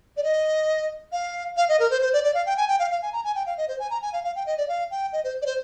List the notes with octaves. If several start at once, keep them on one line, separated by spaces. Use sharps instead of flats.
D5
D#5
F5
F5
D#5
A#4
C5
C5
D5
D5
F5
G5
G#5
G5
F5
F5
G#5
A#5
G#5
G5
F5
D#5
C5
G#5
A#5
G#5
F5
F5
G5
D#5
D5
F5
G5
D#5
C5
D5
C5